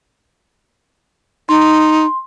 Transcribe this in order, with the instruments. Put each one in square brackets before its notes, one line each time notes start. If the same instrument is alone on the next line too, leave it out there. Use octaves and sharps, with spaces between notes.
[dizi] D#4 [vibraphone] C6